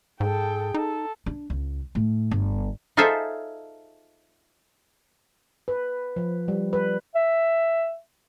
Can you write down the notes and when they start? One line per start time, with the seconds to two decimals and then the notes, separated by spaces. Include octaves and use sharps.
0.20 G#2 G#4 A4 G5
0.74 D#4 A4
1.26 D4
1.50 C#2
1.95 A2
2.31 G1
2.97 D#4 F4 G#4 A4 C5 E5
5.68 B4
6.16 F3
6.48 G3
6.73 B4
7.15 E5